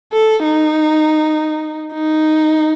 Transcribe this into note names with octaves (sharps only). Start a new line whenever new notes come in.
A4
D#4
D#4